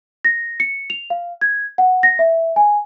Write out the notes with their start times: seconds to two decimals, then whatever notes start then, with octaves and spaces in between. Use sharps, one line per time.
0.25 A#6
0.60 C#7
0.90 F7
1.10 F5
1.41 G#6
1.78 F#5
2.03 A#6
2.19 E5
2.56 G#5